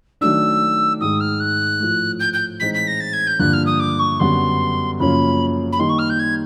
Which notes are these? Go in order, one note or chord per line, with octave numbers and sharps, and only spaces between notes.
D#3 F#3 A3 D4 E6
G#2 D#3 G#3 D#6
F6
F#6
A2 F3 A3
G6
G6
A2 E3 G#3 C4 D#4 B6
B6
A#6
A6
G#6
G6
G2 D3 F3 A#3 D4 F#6
F6
D#6
D6
C#6
F#2 D3 G3 B3 C6
F#2 C#3 F3 A#3 C#4 B5
B5
D#3 G3 A#3 D#4 G4 C6
C#6
F6
G6
G#6